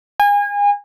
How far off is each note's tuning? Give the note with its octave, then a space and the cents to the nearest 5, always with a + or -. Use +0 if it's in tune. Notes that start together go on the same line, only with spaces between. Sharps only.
G#5 -30